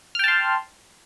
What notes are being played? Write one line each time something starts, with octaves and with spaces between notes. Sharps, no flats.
G5 A5 C6 F6